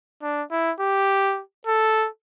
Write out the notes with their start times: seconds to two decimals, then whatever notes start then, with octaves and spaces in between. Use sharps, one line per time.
0.23 D4
0.51 E4
0.80 G4
1.67 A4